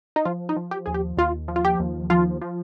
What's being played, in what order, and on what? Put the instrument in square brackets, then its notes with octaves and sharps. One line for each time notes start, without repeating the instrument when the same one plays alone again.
[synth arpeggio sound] D#4
F3 F4
D#4
F3
G4
D#2 G#4
G4
D#2 F4
F3
F4
G4
D#2
F3 F4
F3